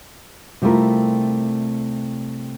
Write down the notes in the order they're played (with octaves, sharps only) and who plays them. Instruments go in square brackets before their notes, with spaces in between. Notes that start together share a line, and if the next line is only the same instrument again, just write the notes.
[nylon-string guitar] C3 G3 A3 E4 F4 A#4